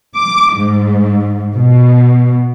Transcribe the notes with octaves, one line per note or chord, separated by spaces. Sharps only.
D6
G#2
B2